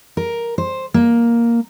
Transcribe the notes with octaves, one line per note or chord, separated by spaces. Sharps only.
A#4
C5
A#3